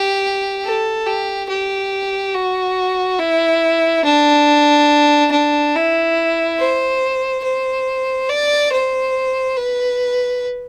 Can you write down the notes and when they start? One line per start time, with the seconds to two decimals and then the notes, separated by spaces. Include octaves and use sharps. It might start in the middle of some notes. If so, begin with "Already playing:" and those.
Already playing: G4
0.64 A4
1.06 G4
1.49 G4
2.34 F#4
3.19 E4
4.05 D4
5.32 D4
5.75 E4
6.59 C5
7.44 C5
8.30 D5
8.72 C5
9.57 B4